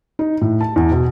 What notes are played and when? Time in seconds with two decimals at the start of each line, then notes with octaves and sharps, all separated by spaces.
0.19 D#4
0.41 A2
0.61 A5
0.76 E2
0.92 B2